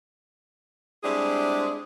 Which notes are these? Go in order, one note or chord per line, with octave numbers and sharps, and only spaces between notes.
G3 G#3 C4 D4 E4 G#4